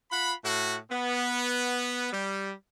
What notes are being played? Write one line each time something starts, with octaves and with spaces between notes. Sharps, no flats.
F4 F#5 B5
A2 F#4
B3
G3